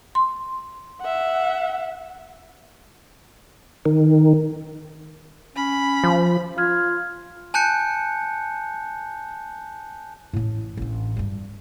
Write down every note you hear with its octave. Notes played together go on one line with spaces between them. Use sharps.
C6
E5 F#5
D#3
C#4 B5
F3
F4 F6 G#6
G#5 A5 F#6 G6 C#7
A1 A2
A1 D4
G2 G3